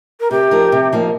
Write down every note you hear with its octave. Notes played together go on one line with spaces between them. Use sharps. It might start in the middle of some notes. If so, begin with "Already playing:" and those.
A#4
C3 G4
F3 D#4 A#4
C3
F3 A#3 D#4